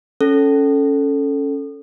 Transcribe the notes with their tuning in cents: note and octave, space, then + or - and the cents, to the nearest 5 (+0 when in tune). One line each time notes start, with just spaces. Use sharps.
C#4 +0 A4 +0